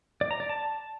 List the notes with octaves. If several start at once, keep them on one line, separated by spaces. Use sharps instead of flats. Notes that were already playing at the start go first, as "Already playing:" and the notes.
D5
A#5
D5
A5